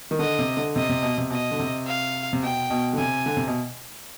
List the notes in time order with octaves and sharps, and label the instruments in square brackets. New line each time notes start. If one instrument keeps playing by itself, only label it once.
[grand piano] D#3
[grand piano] D3 [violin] D#5
[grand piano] C3
D3
[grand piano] C3 [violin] D#5
[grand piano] C3
B2
C3
[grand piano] B2 [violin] D#5
[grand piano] D3
C3
[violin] F5
[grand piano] C3
[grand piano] B2 [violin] G5
[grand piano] B2
D3
[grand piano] C3 [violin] G#5
[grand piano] D3
C3
B2